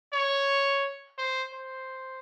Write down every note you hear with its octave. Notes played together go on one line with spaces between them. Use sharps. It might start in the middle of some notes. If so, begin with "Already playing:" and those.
C#5
C5
C5